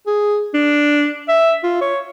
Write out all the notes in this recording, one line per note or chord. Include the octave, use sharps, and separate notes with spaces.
G#4
D4
E5
F4
C#5